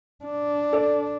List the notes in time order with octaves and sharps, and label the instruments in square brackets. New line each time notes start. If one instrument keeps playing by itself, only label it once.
[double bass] D4
[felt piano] A4 D5